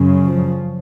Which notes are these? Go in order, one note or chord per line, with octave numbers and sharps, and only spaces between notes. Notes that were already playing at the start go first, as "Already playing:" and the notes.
Already playing: F#2 C#3
F3